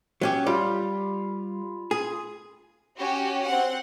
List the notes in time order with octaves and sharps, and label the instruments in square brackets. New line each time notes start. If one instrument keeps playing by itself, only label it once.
[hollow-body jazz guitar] F#3 C#4 G4
[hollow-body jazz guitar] G3 [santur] F4 F5 B5
[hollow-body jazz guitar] G#4
[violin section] C#4 F#4 G4
C4 F#5